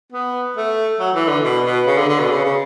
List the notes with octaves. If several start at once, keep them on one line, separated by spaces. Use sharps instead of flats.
B3
A3
F#3
E3
D3
B2
B2
C#3
D3
D3
B2
C#3
C#3